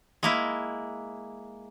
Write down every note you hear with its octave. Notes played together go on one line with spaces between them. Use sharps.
G#3 A#3 E4